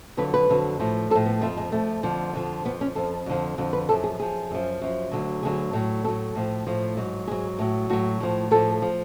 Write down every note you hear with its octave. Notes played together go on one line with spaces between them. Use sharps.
F2 D3 F#3 B4
B4
F2 D3 F#3
A2 F3
F3 A4
A2
B3
F2 F3 A3
G#3
F2 F3 A3
F2 D3 F3
F2 D3 F3
F2 F3 B3
C#4
F2 F3 A4
F2 D3 F3
F2 D3 F3
B4
F#2 F3 A4
G#4
F#2 F3 G#4
F#2 F3
F#2 F3
D2 D3 F#3
D2 D3 F#3 G#4
A2 F#3
A2 F#3 A4
A2 F3
A2 F3
G#2 F#3
G#2 F#3 G#4
A2 F#3
A2 F#3 F#4
A2 F3
A2 F3 A4
F3